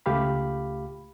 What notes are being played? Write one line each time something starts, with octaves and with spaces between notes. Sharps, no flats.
C#2 A3 G4 F5 B5